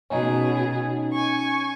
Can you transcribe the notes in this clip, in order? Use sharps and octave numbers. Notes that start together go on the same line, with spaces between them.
B2 C#4 D#4 G#4
G#5 C#6